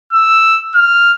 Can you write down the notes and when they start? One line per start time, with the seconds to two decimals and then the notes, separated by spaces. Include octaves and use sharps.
0.12 E6
0.75 F6